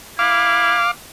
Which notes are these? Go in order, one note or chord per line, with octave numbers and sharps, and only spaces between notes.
E4 F5 D6